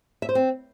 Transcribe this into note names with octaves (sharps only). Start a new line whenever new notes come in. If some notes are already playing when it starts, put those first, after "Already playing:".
E5
C5
C4